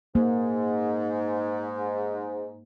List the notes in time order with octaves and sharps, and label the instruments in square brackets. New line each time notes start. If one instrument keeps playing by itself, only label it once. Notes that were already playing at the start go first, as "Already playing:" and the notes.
[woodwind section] G#2 [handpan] A#3